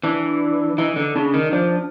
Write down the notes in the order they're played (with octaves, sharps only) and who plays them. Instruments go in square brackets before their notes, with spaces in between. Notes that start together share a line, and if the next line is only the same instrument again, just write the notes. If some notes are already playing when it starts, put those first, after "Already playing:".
[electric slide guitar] E3 [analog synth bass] D4
[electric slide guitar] E3 [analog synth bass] D#4
[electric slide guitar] D3
[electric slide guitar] C#3 [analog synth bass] D4
[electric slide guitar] D#3
[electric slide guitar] F3 [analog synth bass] D4